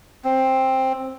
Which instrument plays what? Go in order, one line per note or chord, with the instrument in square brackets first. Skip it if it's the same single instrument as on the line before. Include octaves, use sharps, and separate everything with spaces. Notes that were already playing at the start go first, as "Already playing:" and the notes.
[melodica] C4